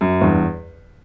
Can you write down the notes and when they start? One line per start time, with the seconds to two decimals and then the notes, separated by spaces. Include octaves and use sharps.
0.01 F#2
0.21 E2 G2